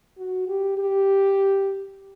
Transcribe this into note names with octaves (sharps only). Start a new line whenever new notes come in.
F#4
G4
G4